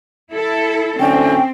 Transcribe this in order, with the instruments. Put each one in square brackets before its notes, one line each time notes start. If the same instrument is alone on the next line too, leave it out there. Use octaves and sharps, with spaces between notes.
[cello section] E4 A4
[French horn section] F#2 A2 D3 [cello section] C4 [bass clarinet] C#4 [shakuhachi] G5